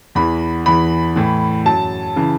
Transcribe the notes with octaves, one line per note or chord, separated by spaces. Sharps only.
E2 E3 B5
E2 E3 B5
A2 E3
F#2 F#3 A5
C#3 E3